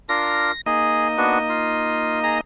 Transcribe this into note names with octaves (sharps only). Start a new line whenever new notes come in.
D4 F4 A#4 A#6
A#3 D#4 G#4 D#5
B3 D4 F#4
F4
G#4 A#5